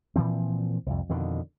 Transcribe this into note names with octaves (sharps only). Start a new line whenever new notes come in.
A#2 E3 F3 C4
C2 F2
F2 B2 D3 D#3